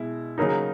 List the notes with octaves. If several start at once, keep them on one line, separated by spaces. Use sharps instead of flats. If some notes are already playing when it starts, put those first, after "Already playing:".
Already playing: B2 G#3 E4
C#3 F#3 A#3 D#4